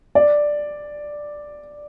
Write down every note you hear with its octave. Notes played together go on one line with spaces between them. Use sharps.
D5